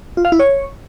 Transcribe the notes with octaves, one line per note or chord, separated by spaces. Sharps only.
F4
F5
E4
C#5